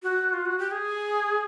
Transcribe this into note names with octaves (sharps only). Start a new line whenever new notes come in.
F#4
F4
F#4
G4
G#4